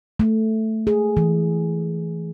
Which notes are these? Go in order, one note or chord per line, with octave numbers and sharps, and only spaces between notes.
A3
G#4
E3